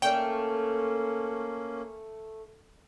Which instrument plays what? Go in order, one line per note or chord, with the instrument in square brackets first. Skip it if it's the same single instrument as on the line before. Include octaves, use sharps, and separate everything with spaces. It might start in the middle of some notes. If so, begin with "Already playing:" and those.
[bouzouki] A3 [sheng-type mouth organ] A#3 C#4 [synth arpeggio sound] G5